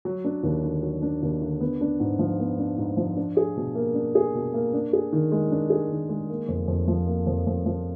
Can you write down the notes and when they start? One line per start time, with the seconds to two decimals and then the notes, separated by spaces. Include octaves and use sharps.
0.05 F#3
0.25 D4
0.43 D#2
0.64 D3
0.83 F#3
1.02 D4
1.23 D#2
1.42 D3
1.60 B3
1.81 D4
2.00 G#2
2.19 F3
2.40 B3
2.58 D4
2.78 G#2
2.97 F3
3.17 D4
3.37 G#4
3.57 B2
3.75 A#3
3.94 D4
4.15 G#4
4.35 B2
4.54 A#3
4.74 D4
4.93 G#4
5.13 D#3
5.32 G#3
5.51 D4
5.70 G#4
5.90 D#3
6.09 G#3
6.29 A#3
6.48 F2
6.68 F2
6.88 F3
7.07 A#3
7.27 F2
7.47 F2
7.66 F3